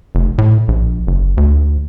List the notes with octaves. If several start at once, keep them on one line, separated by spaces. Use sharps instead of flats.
F1
A2
A#1
F#1
D2